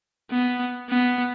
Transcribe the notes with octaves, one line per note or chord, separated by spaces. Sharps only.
B3
B3